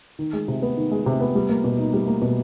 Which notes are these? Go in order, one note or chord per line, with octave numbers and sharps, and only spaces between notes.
D#3
G#3
C3
B3
D#3
G#3
C3
B3
G3
A#3
B2
D#4
G3
A#3
B2